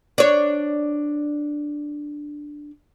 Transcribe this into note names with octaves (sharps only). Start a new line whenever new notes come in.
D4 C#5